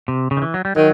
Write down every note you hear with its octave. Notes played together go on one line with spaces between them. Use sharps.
C3
C#3
D#3
E3
F#3
G3
D#3 F#3